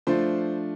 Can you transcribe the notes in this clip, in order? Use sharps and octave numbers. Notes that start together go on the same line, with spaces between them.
F3 A3 D4 F4 C5